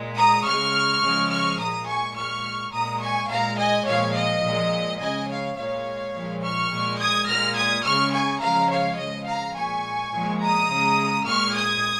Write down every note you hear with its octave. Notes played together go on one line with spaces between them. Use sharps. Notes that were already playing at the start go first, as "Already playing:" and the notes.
Already playing: A#2 G#3
A#5 D#6
C#3 G#3 C#6 F6
C#3 F3 G#3
C#6 F6
A#2 G#3 A#5 D#6
G#5 C#6
A#2 G#3 C#6 F6
A#2 G#3 A#5 D#6
G#5 C#6
A#2 G#3 F5 A#5
D#5 G#5
A#2 F3 G#3 C#5 F5
D#5
A#2 F3 G#3
C#3 G#3 D#5 G#5
C#5 F5
A#2 G#3 C#5 F5
A#2 F3 G#3
C#6 F6
A#2 G#3
D#6 G#6
A#2 G#3 F6 A#6
D#6 G#6
C#3 G#3 C#6 F6
G#5 C#6
C#3 F3 G#3 F5 A#5
C#5 F5
C#3 F3 G#3 D#5
F5 A#5
A#2 G#3 G#5 C#6
A#2 F3 G#3
A#5 D#6
C#3 G#3
A#2 G#3 C#6 F6
D#6 G#6